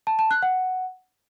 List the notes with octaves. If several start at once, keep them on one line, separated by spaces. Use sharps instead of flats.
A5
A5
F#6
F#5